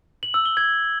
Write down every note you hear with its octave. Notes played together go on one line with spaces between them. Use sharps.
F#7
E6
G7
G#6